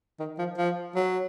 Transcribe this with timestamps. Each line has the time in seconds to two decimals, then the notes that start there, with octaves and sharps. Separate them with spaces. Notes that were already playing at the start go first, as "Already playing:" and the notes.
0.20 D#3
0.38 F3
0.58 F3
0.96 F#3